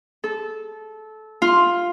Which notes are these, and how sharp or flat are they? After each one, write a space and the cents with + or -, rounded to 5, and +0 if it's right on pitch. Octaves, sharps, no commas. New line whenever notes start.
A4 -20
F4 +5